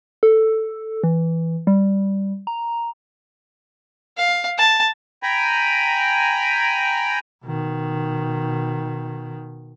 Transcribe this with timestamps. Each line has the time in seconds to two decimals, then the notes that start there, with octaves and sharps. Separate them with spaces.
0.23 A4
1.04 E3
1.67 G3
2.47 A#5
4.17 F5
4.58 A5
5.23 G5 G#5 A#5 B5
7.44 B2 D#3